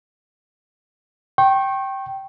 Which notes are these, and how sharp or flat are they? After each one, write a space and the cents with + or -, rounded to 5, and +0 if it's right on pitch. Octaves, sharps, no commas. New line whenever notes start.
G5 -10 C#6 -35